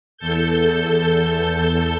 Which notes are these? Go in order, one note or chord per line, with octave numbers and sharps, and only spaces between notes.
E2 A4 G6